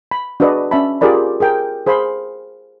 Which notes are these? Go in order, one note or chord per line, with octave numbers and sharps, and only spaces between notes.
B5
D4 F#4 G#4 B4 D5 D#5
C#4 D5 E5 A5 B5
F4 G4 G#4 A#4 D5 B5
G#4 A#4 G5
G#4 C5 F5 B5 C6